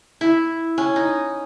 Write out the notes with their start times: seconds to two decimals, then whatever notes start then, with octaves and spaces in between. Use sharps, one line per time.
0.21 E4
0.78 C#4
0.96 D#4